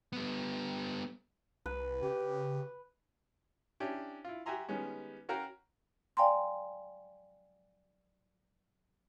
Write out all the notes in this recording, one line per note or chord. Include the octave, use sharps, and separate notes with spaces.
G3 B3
C2 B4
C#3 G4
C#4 D4 E4 G4
E4 F4
F#4 G4 E5 G#5 A#5 C6
D#3 G3 G#3 B3 C#4
C#4 F#4 A#4 F5 G5 A#5
D5 F5 G5 G#5 A#5 C6